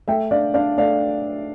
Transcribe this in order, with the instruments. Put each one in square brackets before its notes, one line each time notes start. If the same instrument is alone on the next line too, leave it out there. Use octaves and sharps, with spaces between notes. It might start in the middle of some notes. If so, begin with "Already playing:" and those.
[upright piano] A3 E5 G5
D4 D5 F5
D4 D5 F5
A3 D5 F5